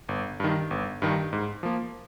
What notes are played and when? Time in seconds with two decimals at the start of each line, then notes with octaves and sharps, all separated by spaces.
0.09 G1
0.40 G2 D#3
0.71 G1
1.02 G2 D#3
1.33 G#2
1.63 F3 A#3